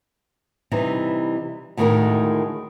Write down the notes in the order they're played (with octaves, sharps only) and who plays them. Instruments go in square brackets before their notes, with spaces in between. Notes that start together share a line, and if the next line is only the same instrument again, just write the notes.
[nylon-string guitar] C3 E3 G3 D#4
D2 A2 D#3 F#3 G#3 A#4